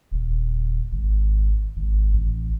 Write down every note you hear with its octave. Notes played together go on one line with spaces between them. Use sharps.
D#1
G#1
G#1
A1